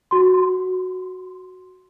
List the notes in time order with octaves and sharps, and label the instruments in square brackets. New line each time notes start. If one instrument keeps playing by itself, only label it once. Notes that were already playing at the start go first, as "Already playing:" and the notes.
[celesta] F#4 C6